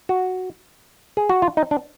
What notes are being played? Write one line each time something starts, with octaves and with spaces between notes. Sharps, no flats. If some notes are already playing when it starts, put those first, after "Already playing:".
F#4
G#4
F#4
F4
D#4
D4